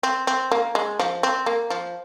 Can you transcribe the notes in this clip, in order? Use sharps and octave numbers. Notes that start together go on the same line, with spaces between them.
C4
C4
A#3
G#3
F3
C4
A#3
F3